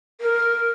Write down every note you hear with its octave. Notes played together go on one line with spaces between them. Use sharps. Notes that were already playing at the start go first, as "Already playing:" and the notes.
A#4